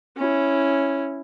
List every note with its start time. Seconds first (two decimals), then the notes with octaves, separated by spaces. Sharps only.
0.17 C#4 E4